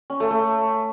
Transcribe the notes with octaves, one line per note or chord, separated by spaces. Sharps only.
C#4
A3
A3